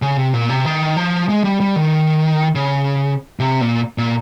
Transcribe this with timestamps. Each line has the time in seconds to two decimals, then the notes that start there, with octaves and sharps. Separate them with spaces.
0.02 C#3
0.17 C3
0.33 A#2
0.49 C3
0.65 D#3
0.97 F3
1.29 G#3
1.44 G3
1.60 G3
1.76 D#3
2.55 C#3
3.40 C3
3.61 A#2
3.98 A#2